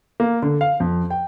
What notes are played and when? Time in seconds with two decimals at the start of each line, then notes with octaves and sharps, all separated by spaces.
0.20 A#3
0.42 D3
0.61 F5
0.80 F2
1.10 G5